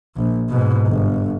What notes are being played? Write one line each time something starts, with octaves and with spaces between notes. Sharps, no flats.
A#1
G#2 B2
G1